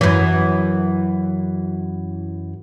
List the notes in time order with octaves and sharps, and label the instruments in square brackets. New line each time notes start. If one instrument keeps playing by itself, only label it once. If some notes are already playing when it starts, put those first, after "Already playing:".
[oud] F#2 E3